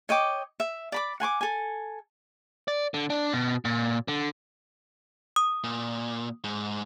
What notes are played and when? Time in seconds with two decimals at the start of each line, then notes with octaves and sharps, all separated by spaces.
0.09 C#5 D#5 G5 D6
0.60 E5
0.92 D5 B5 D6
1.20 F#5 G#5 C6 D6
1.41 A4 G#5
2.68 D5
2.94 D3
3.10 D4
3.33 B2
3.65 A#2
4.08 D3
5.36 D#6
5.64 A#2
6.44 G#2